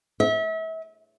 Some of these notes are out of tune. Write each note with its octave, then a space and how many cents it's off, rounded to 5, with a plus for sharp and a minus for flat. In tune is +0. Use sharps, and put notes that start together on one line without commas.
E5 -35